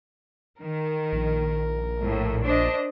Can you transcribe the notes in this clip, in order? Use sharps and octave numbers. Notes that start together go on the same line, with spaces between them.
D#3 A#4
A#1
A2
D4 C5 D#5